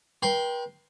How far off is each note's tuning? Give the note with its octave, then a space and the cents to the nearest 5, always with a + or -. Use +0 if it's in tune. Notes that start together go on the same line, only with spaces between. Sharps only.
B4 -45 G5 +0 C6 +0